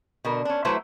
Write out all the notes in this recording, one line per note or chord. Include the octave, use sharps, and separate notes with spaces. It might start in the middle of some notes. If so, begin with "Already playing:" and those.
B2 D3 A#4
C#4 D4
F#3 A3 E4 B4 C5 E5